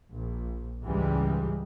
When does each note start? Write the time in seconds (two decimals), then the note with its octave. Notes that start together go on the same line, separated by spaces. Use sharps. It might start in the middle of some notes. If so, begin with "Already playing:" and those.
0.11 A#1
0.85 C#2 G#2 E3 G3 G#3